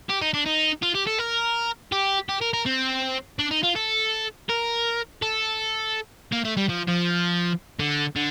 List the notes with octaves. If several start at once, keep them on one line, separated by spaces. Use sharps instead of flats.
G4
D#4
D4
D#4
F4
G4
A4
A#4
G4
G4
A#4
A#4
C4
D4
D#4
F4
A4
A#4
A4
A#3
A3
G3
F3
F3
D3
D3